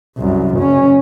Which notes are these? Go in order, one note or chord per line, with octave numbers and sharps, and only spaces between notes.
C2 F#2
F#1 C#4